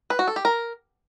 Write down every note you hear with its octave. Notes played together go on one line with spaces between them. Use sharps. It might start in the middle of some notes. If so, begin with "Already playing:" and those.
B4
F#4
A4
G4
A#4